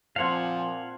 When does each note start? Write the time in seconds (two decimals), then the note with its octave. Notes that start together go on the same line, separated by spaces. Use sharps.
0.16 A#2 F3 C4 F4 F5 F#5 G#5 A5